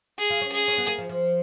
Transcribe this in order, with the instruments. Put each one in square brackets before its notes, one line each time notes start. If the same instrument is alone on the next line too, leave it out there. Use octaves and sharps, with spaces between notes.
[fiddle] G#4
[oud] F4
C#4
[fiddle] G#4
[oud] C#4
B3
A#3
F3
F3